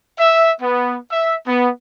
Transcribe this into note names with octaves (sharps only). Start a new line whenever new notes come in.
E5
B3
E5
B3